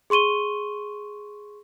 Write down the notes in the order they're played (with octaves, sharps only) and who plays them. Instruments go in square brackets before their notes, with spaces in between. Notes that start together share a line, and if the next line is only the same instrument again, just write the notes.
[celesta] G#4 C6 C#6 D#7 G7